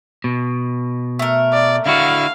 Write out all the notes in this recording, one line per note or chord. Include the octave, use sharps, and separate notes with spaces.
B2
A3 A#4
D5
D3 E4 F#4 F5